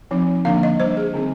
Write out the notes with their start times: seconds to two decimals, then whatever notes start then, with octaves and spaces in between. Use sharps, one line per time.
0.11 F3 C4 D#4
0.45 D3 F3 A#3 D4 F5
0.63 D#5
0.80 G3 D4 C5
0.97 G#4
1.14 D3 G3 C4 D#4